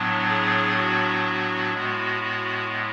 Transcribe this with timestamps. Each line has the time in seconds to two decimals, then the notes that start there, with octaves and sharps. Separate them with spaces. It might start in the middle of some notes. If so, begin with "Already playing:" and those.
Already playing: A2 F#3 B3 D4
0.29 G#4
0.77 F#4
1.26 F#4
1.74 A2 G#3 B3 F#4
2.23 F#4